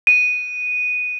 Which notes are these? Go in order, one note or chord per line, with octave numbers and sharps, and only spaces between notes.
D#7